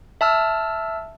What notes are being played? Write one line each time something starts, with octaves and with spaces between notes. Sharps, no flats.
E5 A5 E6 F6